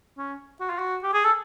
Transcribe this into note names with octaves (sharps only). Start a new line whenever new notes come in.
C#4
F#4
F4
F#4
G4
G#4
A4